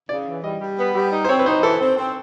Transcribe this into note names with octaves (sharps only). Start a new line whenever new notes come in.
C#3 D5
E3
G3 D#5
G3
B3
G3
D#4
C5
C4 C#5
B4
D#4 C5
E3 A4
C4
C4